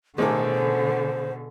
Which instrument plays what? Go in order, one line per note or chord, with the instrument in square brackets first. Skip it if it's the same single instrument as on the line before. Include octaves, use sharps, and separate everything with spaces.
[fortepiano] A1 D#3 D6 [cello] B2 D3 [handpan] G#4 A4 [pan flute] C5